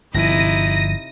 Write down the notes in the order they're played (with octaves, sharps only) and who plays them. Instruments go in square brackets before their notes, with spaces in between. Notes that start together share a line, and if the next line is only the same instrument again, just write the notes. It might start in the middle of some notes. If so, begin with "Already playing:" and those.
[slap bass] G1 F3 [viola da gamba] C3 D#4 E4 [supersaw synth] A#6 D#7